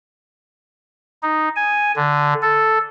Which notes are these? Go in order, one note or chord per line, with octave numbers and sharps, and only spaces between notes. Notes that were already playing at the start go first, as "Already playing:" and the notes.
D#4
G#5
D3
A4